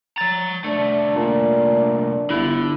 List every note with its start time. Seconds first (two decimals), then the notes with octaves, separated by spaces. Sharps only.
0.18 C#5 A#5 A6
0.65 C2 A3 D4
1.16 A#2 D4
2.30 G1 D3 E4